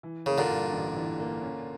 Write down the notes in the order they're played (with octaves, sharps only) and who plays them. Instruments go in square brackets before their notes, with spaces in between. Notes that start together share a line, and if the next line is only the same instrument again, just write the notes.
[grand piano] E3
[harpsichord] C#3 [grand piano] A#3
[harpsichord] A#2 D3
[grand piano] G2
A1
E3
A#3
C#4